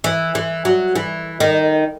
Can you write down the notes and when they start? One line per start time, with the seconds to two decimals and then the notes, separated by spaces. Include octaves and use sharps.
0.04 E3
0.35 E3
0.65 F#3
0.96 E3
1.40 D#3